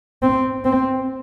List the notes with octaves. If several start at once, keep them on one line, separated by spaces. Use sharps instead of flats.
C4
C4